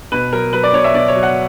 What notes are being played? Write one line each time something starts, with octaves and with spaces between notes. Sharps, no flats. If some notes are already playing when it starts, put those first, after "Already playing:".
B2 B4
F#3 A#4
F#3 B4
D5
B2 C#5
E5
B2 D5
C#5
F#3
F#5